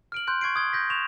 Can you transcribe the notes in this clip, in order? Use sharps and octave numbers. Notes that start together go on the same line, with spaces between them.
F6 D7 F#7
C6 F#6 G6
C#6 G#6 C7 D7
D#6 G#6 G7
G6 A#6 B6
C#6 E7 F7